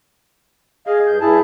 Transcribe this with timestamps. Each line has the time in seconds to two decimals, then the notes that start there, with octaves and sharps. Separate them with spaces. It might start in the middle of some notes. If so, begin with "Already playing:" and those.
0.87 G#4 D#5 F5
1.07 G2 G6
1.21 G2 E4 G#4 A5